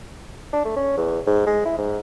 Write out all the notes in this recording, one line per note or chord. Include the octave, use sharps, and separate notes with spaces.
D4
A3
C#4
E2
G#2
G#3
E4
G#2